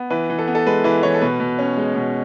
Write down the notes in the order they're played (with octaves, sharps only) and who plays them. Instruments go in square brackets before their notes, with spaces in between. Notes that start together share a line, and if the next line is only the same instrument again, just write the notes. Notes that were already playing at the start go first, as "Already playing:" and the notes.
Already playing: [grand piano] B3
E3 B4
E3
A4
B3
A4
G#3 B4
E3 B4
E3 C#5
A4
B2 B4
B2
C#4
G#3
B2